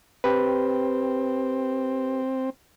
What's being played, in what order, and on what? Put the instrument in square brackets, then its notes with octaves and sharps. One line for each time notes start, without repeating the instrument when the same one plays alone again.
[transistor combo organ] C4 [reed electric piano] G4 B4